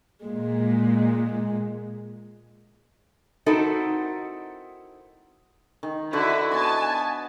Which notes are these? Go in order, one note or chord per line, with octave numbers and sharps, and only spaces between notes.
A#2 G#3
C4 D#4 E4 F#4 A4 A#4
D#3
D3 E4 F#4 B4
B3 D#5 G#5 A5